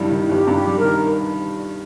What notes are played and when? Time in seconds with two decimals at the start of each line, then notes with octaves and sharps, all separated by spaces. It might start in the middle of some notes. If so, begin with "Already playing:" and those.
Already playing: G1 G2 D#3 G3 E4
0.11 D#3
0.29 G1 G4
0.48 G2
0.53 G4
0.65 G3
0.78 A#4
0.83 D#3